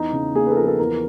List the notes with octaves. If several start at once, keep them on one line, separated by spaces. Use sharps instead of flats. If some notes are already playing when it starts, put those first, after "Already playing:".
Already playing: E2 D#4
C#3
A#3 G#4
B4
A4
F3 A#4
A4
E2 A#4